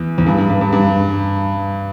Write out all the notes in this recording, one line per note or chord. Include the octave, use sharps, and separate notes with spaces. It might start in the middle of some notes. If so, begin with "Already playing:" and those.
Already playing: E2
E2
G2
G2
G2
G2
G2